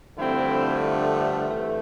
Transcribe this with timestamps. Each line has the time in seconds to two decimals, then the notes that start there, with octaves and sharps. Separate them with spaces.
0.18 G2 D3 F3 A3 C4 E4
1.49 C3 E3 A3